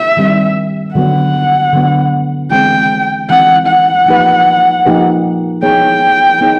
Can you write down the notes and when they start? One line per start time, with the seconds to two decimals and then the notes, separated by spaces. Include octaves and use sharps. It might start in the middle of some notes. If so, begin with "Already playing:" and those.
Already playing: E5
0.17 D#3 G3 C4
0.94 D3 F#3 B3 F#5
1.73 D3 F#3 B3
2.50 E3 G#3 C4 G5
3.29 E3 G#3 C4 F#5
3.67 F#5
4.06 F3 A#3 D#4 G4 B4
4.85 F3 A#3 D#4 G4 B4
5.63 B3 D#4 G#4 C#5 G5
6.41 B3 D#4 G#4 C#5